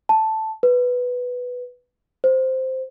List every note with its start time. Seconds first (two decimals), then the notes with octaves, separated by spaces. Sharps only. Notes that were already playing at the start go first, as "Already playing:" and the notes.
0.09 A5
0.63 B4
2.24 C5